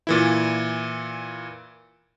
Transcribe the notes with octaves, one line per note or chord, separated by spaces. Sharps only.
A#2 E3 E4